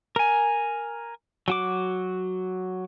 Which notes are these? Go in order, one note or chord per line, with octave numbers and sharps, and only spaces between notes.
A#4 G#5
F#3 F#4 D6